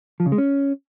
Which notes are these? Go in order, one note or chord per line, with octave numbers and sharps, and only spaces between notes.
F3
C#3
G#3
C#4